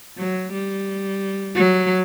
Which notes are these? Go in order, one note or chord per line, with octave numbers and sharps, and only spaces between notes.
F#3
G3
F#3